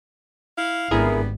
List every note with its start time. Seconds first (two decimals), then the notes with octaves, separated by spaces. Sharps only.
0.57 E4 F5
0.91 G#1 D3 G3 B3 E4 G#4 A#4